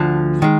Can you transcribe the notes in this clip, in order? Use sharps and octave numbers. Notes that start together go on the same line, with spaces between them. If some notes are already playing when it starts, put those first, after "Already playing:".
Already playing: D2 D3 F3
D#3 G#3